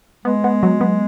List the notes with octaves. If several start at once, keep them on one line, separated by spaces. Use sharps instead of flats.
G#3 B3
B3
F#3
B3